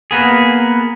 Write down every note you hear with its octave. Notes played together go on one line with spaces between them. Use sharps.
A#3 B3 G#4